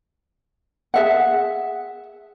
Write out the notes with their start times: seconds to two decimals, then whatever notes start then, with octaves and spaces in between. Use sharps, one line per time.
0.94 G#4 E5 F#5